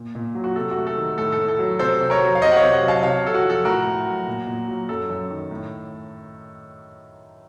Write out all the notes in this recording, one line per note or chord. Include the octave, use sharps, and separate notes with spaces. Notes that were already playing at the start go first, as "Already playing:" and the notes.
Already playing: A#2
A#2
F#3
F#4
C3 A4
F#4
A3
A4
D#3
A2 A4
A4
A2
A4
F#3
C3 A4 C5
C3
A#4 C#5
F#3
F5
C3 C5 D#5
F#5
C#5 F5
C3
D#5 F#5
F#3
F5 A5
C3 C#5 F5
C3 A4
F#4
F3
A4
A2 F#4 A#4
A2
F#3
A#2
A#2
F#3
F#2 A4
F#2
D#3
A2